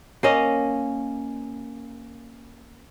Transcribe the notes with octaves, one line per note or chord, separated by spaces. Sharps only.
A#3 C#4 D#5